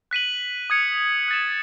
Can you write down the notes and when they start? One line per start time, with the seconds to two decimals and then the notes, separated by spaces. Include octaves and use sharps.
0.11 F#6 B6 D#7 F#7
0.70 D#6 G#6 C#7
1.28 F#6 A6 E7